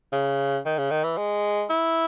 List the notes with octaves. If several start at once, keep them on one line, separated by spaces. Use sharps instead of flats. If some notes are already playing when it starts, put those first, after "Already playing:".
C#3
D#3
C#3
D#3
E3
G#3
E4